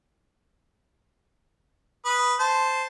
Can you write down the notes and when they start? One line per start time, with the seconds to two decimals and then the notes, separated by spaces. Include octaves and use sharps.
2.05 B4 D#6
2.39 C5 A5